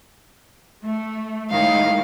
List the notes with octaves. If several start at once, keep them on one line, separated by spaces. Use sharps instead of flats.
A3
A2 D#3 G#3 F5